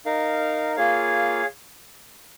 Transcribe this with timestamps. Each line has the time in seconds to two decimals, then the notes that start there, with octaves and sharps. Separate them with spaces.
0.06 D#4 A#4 F5
0.76 A#3 F4 G#4 C#5 F5